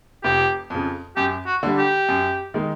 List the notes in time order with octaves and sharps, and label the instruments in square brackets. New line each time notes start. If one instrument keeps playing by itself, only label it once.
[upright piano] F1 [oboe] G4
[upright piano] F2 C#3
[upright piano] F#2 [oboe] G4
[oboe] F#4
[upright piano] D3 G3
[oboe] G4
[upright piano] F#2
D#3 G#3